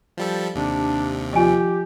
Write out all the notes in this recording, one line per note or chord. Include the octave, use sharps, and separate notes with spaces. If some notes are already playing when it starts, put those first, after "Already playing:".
F3 G3 A4
D#2 C3 D4
F3 F4 G4 D#5 G#5